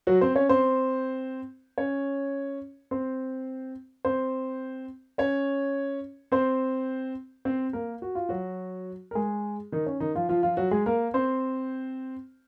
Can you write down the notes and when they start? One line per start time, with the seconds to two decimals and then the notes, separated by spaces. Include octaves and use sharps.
0.07 F#3 F#4
0.21 C4 C5
0.35 C#4 C#5
0.49 C4 C5
1.78 C#4 C#5
2.91 C4 C5
4.05 C4 C5
5.18 C#4 C#5
6.32 C4 C5
7.45 C4 C5
7.73 A#3 A#4
8.02 F#4
8.15 F4
8.29 F#3 F#4
9.11 A#4
9.15 G#3 G#4
9.72 D#3 D#4
9.86 C#4
10.00 D#3 D#4
10.15 F3 F4
10.29 F3 F4
10.43 F3 F4
10.57 F#3 F#4
10.71 G#3 G#4
10.86 A#3 A#4
11.14 C4 C5